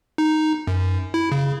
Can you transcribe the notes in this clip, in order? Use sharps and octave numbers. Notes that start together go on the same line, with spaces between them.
D#4
F#2
E4
C#3